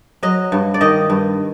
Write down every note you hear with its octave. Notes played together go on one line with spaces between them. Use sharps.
F#3 D#5
G2
D5
D#3 D#5
G2